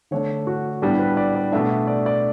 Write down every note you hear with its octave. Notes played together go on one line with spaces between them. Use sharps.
D3 A3 D4 C#5
F#4
A2 G3 B3 D4 G4
B4
D5
D5
B2 A3 D4 E5
E5
D5
D5